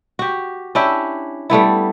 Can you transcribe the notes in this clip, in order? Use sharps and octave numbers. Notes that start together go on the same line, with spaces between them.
F#4 G4
C#4 D4 E4 G4
G3 A3 B3 E4